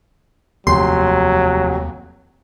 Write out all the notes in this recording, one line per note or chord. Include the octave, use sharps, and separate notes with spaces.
F1 D#2 F#3 C6